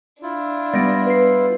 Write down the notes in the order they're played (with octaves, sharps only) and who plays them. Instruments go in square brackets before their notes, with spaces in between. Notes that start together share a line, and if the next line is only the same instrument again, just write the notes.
[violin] D4 [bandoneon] E4 F4
[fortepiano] G3 B3 [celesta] A6 A#6 D7
[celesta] B4 C7